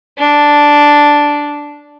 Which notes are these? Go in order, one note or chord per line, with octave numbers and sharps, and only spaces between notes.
D4